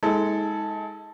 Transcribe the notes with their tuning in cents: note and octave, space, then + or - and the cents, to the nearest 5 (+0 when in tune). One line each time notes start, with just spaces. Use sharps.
G#3 +0 D#4 +45 A4 +0